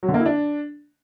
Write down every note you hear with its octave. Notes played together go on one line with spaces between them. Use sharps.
F#3
D3
A#3
E4
D4